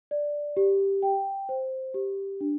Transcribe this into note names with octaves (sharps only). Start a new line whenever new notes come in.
D5
G4
G5
C5
G4
D4